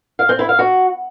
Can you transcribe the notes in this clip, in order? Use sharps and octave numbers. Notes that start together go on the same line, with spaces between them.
F5
C4
E4
F5
F#4